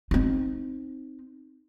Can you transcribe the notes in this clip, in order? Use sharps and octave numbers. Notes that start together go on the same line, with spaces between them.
C4 D#4